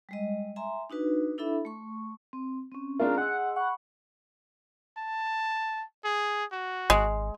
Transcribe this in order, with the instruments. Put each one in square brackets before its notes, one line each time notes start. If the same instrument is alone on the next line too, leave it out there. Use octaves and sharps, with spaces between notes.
[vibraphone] G3 G#3 D#5
E5 G#5 A#5 C6
D4 D#4 F#4 B4
D4 E4 A4 E5 B5
A3 C#6
C4
C4 C#4
[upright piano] G#3 D4 F4 [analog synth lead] A#4
[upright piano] G#4 [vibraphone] D#5 C6 E6 [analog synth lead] F#5
[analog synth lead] F#5
[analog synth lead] F#5 [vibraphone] B5 C#6
[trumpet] A5
G#4
F#4
[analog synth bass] G#1 [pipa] G#3